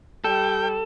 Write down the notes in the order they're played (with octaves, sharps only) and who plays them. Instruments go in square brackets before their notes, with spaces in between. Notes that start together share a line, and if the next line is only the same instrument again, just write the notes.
[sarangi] G3 [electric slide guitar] A4 [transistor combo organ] G5